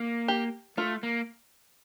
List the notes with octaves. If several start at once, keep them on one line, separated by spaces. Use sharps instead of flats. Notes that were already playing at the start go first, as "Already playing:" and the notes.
Already playing: A#3
G4
A3 F4
A#3